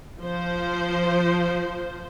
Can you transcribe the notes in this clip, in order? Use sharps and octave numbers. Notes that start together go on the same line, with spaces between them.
F3 C5